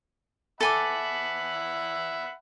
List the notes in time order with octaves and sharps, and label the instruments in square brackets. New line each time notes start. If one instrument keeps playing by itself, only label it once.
[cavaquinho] A4 G#5 D6 [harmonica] E5 F#5 B5